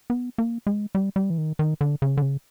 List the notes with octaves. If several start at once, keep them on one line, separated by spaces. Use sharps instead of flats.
B3
A#3
G#3
G3
G3
E3
D#3
D#3
D3
C#3
D3
C#3